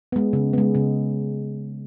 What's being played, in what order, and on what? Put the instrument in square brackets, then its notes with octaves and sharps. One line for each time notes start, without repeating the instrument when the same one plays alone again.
[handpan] G#3 B3
C#3
G#3 B3
C#3